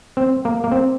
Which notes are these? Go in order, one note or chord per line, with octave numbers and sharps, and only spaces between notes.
C4
A#3
A#3
C4